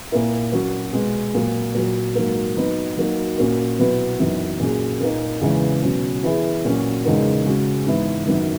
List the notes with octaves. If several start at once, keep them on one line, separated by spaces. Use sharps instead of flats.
A#2 A#3 E4 A#4
F#3 C#4 F#4 A#4
B2 G#3 B3
A#2 F#3 A#3
A#2 F#3 A#3
G#2 F#3 A#3
F#3 B3 D#4
F#3 A#3 D#4 F#4
A#2 A#3 C#4 F#4 A#4
B2 F#3 B3 E4
F#2 E3 B3 D#4 F#4
A#2 F#3 C#4 G#4
A#2 A#3 D#4 A#4
E2 C#3 E3 G#3
B2 F#3 C#4
E3 B3 E4 G#4
A#2 F#3 C#4 F#4
E2 C#3 G#3 D#4 A#4
C#3 G#3 C#4 F#4
G#2 E3 B3 E4
F#2 D#3 F#3 B3 E4